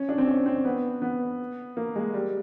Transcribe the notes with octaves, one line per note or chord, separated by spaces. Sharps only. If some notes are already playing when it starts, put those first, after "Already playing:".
Already playing: C#4
D4
C4
C#4
C4
B3
B3
A#3
G#3
G3